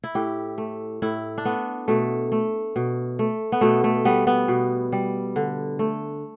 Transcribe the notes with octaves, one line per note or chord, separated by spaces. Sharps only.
E4
A2 G4
A3
A2 E4
D4
A3 B3
B2 A3
A3
B2
A3
B3
B2 A3
A3
G3 B3
B3
B2
G3
D3
A3